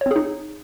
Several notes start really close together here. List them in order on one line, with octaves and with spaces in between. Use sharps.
C#5 C4 G#4 D#4